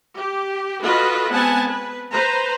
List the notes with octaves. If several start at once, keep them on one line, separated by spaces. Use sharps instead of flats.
G4
F4 F#4 A4 B4 D#5
G#3 B3 C4 F#5 G#5 A5
B4
B4 C5 A#5